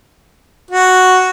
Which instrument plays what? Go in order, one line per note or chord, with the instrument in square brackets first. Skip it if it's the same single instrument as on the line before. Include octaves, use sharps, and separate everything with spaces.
[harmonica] F#4